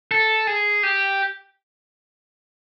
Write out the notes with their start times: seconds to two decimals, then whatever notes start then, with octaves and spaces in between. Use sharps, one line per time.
0.11 A4
0.47 G#4
0.83 G4